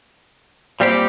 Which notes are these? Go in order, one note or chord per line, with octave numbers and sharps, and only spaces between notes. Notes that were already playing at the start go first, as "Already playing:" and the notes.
A#2 G3 C4 G4